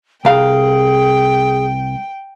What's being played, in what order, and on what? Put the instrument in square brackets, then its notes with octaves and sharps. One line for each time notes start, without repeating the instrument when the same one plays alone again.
[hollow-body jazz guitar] C2 F5 [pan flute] G#4 [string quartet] G5